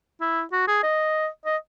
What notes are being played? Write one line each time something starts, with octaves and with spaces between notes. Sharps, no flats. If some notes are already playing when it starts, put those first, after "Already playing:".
E4
F#4
G#4
D#5
D#5